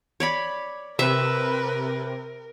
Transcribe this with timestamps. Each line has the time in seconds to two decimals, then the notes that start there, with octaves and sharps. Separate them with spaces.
0.20 C#5 D5 B5
0.99 C3 A#4 B4 E5